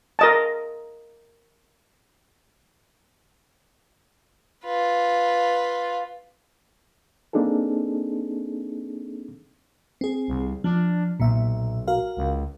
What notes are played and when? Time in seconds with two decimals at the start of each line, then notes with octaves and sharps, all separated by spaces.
0.19 A#4 D#5 A5
4.65 F4 B4
7.33 A#3 C4 D4 D#4 G#4 A4
10.01 C4 G#4
10.28 C2
10.64 F3 D4
11.20 B1 A#2 E5
11.87 F#4 A#4 F5
12.17 C#2